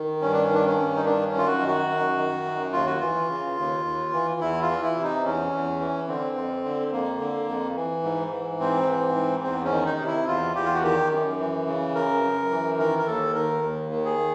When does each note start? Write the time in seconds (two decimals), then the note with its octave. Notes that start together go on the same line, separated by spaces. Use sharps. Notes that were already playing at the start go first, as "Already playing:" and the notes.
Already playing: D#3
0.21 G2 C#4
0.33 D4
0.43 C#4
0.49 D#3
0.54 D4
0.65 C#4
0.78 G2
0.96 D#4
1.05 D#3 D4
1.26 C#4
1.34 F#2 F4
1.47 F#4
1.61 D#3
1.68 F#4
1.89 F#2
2.17 D#3
2.45 F#2
2.73 D#2 F4
2.86 F#4
3.00 E3 F4
3.29 C#3
3.57 D#2
3.85 D#2
4.12 E3
4.41 E2 E4
4.62 F4
4.69 E3
4.83 E4
4.96 C3
5.03 D#4
5.24 E2 C#4
5.52 E2
5.80 E3
6.08 D3 C4
6.36 F2
6.64 D3
6.92 F2 A#3
7.20 D3
7.48 F2
7.76 E3
8.04 G#2
8.32 E3
8.60 G#2 C4
8.88 E3
9.15 G#2
9.43 E2 C4
9.65 C#4
9.71 D#3
9.85 D#4
10.00 C3
10.06 E4
10.28 E2 F4
10.55 E2 G4
10.65 F4
10.74 F#4
10.83 D#3 G4
11.11 F#2
11.39 E3
11.67 C#3
11.95 F#2 A#4
12.23 F#2
12.51 E3
12.79 D#3 A#4
12.99 A#4
13.07 D#2 A4
13.34 D#3 A#4
13.63 D#2
13.91 D#3
14.05 G#4